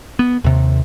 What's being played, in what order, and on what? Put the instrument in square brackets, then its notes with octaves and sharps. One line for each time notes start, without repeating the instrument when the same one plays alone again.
[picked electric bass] B3
D#2 C3